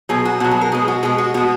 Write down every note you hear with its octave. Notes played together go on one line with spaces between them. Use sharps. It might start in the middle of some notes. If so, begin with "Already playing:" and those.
B2 F#3 G#4
F#4
B2 F#3 F#4
G#4
A#4
B2 G#3 G#4
F#4
B2 G#3 G#4
F#4
B2 G#3 F#4